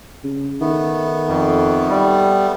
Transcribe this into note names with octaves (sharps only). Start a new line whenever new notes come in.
C#3
D#3 A3 B3
F2
G3